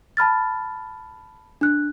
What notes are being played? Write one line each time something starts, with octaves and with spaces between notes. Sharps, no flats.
A5 B5 F6 A6
D4 F#6